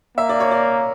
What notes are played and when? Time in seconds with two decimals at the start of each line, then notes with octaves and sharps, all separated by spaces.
0.17 A#3 E5
0.29 D5
0.40 C#5
0.51 D5